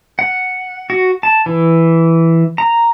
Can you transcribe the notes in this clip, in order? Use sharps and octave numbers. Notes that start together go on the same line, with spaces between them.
F#5
F#4
A5
E3
A#5